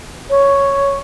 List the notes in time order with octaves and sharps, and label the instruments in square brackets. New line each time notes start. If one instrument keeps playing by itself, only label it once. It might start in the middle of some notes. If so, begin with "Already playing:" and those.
[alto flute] C#5